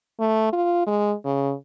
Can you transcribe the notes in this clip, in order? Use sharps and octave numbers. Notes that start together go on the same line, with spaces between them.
A3
F4
G#3
C#3